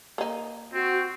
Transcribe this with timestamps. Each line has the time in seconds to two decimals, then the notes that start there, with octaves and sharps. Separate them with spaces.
0.18 A#3 D#4
0.73 C4 F#4